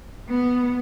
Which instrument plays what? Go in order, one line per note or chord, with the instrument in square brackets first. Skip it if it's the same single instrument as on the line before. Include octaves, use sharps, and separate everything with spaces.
[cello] B3